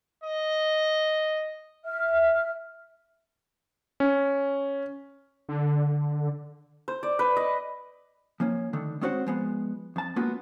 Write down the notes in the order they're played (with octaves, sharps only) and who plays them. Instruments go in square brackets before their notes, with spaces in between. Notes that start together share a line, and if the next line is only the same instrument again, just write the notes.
[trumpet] D#5
[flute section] E5 F6
[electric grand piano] C#4
[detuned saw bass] D3
[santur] C5
D5
B4
D#5
[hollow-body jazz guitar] F3 A#3 C#4
D3 D#3 A3
G#3 C4 C#4 F#4 C5 F#5
F3 G#3 B3
F2 A5
G#3 A#3 B3 C#4 F4 F#4